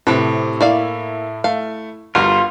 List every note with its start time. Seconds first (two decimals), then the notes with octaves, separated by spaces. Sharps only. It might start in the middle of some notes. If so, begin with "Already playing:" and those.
0.07 A2 C3 C4 A4 B4
0.61 A#3 E4 D5 F5
1.44 A3 F5
2.15 G1 G3 F4 F#4 A#4